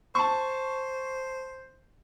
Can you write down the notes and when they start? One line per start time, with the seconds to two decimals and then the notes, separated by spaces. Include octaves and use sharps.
0.15 C5 A5 C#6